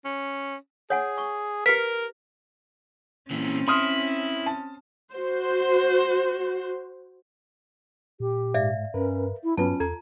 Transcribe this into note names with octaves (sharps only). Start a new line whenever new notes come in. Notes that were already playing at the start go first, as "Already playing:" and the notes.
C#4
G#4 C#5 F#5 G#5
C#6
G4 A#4 B4 B6
A#2 E3 C4 C#4
E4 C6 D#6 F6
A5
F#4 C5
A#2 G4
G#2 D5 E5 F5
G2 C#4 A#4 B4
E4
G2 F#3 B3 C#4 F4 B4 A5
E2 A4 A#5 G#6